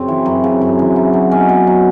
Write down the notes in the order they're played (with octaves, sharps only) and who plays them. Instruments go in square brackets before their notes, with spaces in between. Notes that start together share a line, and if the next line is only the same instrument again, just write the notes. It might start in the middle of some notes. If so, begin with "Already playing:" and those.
Already playing: [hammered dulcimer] F#2 C#3 C4
E3
F#2
C#3
F#2
E3
F#3
F#3
B2 C#4
B2
F#3